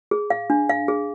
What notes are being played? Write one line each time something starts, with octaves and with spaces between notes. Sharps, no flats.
G#4
F5
D4
F5
G#4